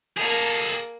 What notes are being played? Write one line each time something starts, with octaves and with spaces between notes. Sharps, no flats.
A#3 G#4 A4